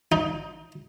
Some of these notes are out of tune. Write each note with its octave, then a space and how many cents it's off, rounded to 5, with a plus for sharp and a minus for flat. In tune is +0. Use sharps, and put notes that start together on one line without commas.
D#4 +20